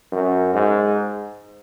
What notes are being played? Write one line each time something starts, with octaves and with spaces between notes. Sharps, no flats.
F#2
G#2